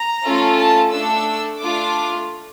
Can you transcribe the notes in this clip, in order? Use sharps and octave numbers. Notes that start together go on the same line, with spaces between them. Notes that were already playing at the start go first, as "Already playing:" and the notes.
Already playing: A#5
A3 C#4 F4 A4
A5
A3 D4 A4 E6
A3 D4 F4 D6